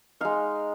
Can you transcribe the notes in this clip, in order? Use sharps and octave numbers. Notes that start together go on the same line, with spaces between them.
G#3 D#4 F5